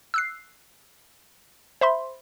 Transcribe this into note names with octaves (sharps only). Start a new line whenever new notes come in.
E6 F#6 C7
C5 E5 B5 C6